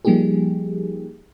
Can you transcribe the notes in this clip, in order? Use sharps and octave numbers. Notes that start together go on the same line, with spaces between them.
F3 G3 A#3 D#4 G4 G#4